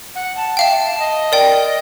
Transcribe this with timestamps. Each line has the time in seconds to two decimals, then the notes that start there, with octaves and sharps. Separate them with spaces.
0.15 F#5
0.37 A5
0.57 E5 F5 G5
0.99 D#5
1.32 A#4 D5 G5